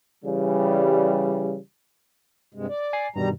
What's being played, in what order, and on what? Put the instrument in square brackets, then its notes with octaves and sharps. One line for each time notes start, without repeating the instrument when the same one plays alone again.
[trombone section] C#3 E3 G3
[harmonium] G2 C3 G#3
D5
[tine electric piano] G#5 C7
[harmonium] E2 G3 A#5 [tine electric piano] G2 B2 D#3